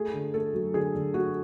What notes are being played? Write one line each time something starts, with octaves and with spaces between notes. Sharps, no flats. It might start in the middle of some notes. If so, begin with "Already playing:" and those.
Already playing: A3 G#4
D3
A3 A4
F#3
D3 G#4
D3
A3 F#4